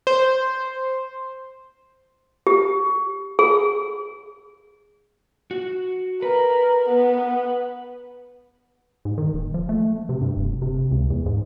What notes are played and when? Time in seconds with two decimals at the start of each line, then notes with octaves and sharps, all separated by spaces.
0.07 C5
2.47 G4
3.39 G#4
5.51 F#4
6.22 A#4 B4
6.89 B3
9.05 G#2
9.18 D#3
9.34 D#1
9.54 F3
9.69 A3
10.09 C3
10.21 G2
10.37 F1
10.62 C3
10.91 C#2
11.10 E2
11.26 G#2